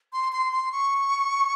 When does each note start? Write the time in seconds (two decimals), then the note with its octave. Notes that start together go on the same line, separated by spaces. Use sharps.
0.13 C6
0.32 C6
0.52 C6
0.72 C#6